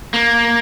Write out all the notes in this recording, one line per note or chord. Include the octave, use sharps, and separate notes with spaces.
A#3